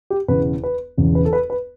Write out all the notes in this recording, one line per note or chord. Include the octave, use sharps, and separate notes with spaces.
G4
E1 E2 C#3 E3 B4
B4
E1 E2 C#3 E3
B4
A4
B4
B4